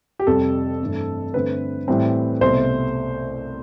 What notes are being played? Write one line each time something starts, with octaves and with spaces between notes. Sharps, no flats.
G4
F2 C3 G3 A4
G2 E3 A3 C4
G2 D3 A3 C4 B4
A2 E3 G3 C4
C2 B2 A3 C4 C5